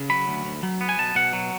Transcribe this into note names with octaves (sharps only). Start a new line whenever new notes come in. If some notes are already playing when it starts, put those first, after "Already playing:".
Already playing: C#3
F#3 B5
D2
D2
F#3
B3
G#5
B2 A5
B2 F#5
F#3